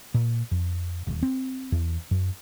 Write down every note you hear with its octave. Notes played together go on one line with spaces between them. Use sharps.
A#2
F2
D#1
C4
E2
F#2